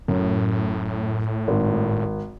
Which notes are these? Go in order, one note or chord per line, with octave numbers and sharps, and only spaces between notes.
F#2 A2
G#1